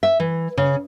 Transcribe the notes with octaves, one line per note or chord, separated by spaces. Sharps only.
E5
E3
C#3